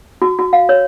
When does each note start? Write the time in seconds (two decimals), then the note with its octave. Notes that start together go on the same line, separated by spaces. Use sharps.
0.22 F#4
0.39 F#4
0.53 F5
0.69 C#5